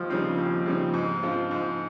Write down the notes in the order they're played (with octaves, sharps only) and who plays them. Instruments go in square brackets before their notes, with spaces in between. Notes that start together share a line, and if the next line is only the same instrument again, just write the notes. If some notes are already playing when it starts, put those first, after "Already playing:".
Already playing: [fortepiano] D#2 [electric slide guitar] F3
[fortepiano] C#3 G3 C4 D#4
D#2
C#3 G3 C4 D#4
G#2
F3 C4 F4
G#2